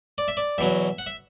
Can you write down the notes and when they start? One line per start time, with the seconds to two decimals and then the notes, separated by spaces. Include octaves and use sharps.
0.18 D5
0.28 E5
0.37 D5
0.58 E2 B2 F#3 E5
0.98 F#5
1.06 E5